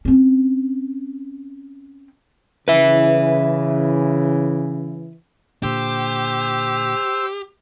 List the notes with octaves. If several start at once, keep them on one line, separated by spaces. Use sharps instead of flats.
C4 C#4
C#3 E3 B4 E5
A#2 D3 G4 C5 E6